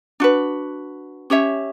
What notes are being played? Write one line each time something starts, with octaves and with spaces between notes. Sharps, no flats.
D4 F#4 B4
C#4 G4 C#5 E5